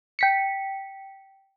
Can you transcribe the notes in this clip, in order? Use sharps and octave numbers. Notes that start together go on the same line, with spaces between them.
G5 B6 C#7